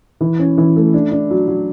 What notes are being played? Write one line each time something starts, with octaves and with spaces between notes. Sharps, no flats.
E3
C#4
E3
A3
D4
D4
F#3
F#3